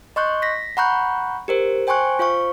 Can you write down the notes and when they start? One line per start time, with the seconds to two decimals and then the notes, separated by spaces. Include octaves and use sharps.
0.16 D#5 C6 C#6 F#6 G6
0.42 A#6 B6
0.77 F#5 A#5 B5 C#6 F#6 G6
1.48 G4 A#4 C5
1.87 C5 G5 G#5 C6 C#6 F#6
2.19 F4 C5 F5 C#6